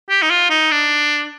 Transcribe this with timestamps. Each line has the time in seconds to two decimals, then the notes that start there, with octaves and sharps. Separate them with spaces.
0.09 G4
0.22 D#4
0.30 F4
0.50 D#4
0.71 D4